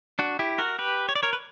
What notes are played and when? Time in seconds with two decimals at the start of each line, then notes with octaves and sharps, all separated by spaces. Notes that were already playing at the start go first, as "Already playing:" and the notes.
0.19 D4 F#4
0.39 E4 G4
0.58 F#4 A#4
0.79 G4 B4
1.09 C#5
1.16 D5
1.23 A#4 C#5
1.33 B4